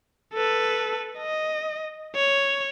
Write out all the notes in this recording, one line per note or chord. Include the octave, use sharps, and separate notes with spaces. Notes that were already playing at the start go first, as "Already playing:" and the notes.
A4 B4
D#5
C#5